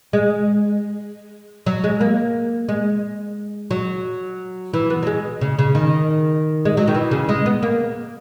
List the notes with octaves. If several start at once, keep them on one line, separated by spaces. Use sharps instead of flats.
G#3
F#3
G#3
A#3
G#3
F#3
E3
B3
F#3
G#3
C#3
C#3
D#3
G#3
F#3
D#3
E3
C#3
G#3
B3
A#3